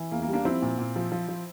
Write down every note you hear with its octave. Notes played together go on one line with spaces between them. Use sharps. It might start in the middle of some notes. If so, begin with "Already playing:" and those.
Already playing: E3
E2 A#3
A#3
G3
A#3 D4
F3 C4 E4
A#2
A#2
F3
F3
F3